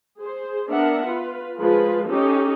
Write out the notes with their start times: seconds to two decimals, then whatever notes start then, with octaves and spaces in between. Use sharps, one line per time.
0.21 G#4 C5
0.71 B3 D4 A#4 E5 F#5
1.06 F4 B4
1.59 F3 G#3 F4 B4
2.09 C#4 D#4 G4 A4